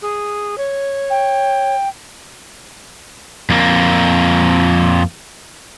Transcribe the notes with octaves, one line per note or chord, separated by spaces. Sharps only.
G#4
C#5
G5
F2 A#3